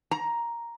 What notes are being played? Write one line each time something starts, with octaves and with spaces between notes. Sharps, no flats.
A#5